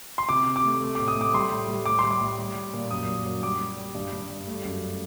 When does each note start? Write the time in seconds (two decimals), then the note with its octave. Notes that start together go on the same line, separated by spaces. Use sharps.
0.18 C6
0.29 C3 D6
0.46 C3
0.56 D6
0.64 A3
0.81 A3
0.95 D6
0.99 A2
1.08 D#6
1.16 A3
1.21 D6
1.34 G3 C6
1.51 A2
1.68 G3
1.86 A2 D6
1.99 G3 C6
2.11 D6
2.21 A2
2.39 G3
2.55 G3
2.74 A#2
2.91 F#2 D#6
3.08 F#2
3.25 F#3
3.43 G3 D6
3.61 G3
3.77 G3
3.95 G2
4.13 G2
4.30 G2
4.47 A3
4.65 F#2